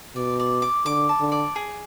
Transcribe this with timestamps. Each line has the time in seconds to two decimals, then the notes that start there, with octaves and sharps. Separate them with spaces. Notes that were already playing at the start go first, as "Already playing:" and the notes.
0.16 B2 D5
0.40 D5
0.62 D6
0.85 D3 D6
1.09 A5
1.20 D3
1.32 D5
1.56 G#4